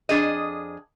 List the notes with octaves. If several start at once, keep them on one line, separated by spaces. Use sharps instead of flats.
F2 D4 G#4 D#5